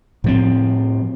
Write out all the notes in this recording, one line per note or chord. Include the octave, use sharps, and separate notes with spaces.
A2 F3 C4